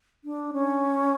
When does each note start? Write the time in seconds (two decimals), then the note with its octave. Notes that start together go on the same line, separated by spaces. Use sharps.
0.24 D4
0.53 C#4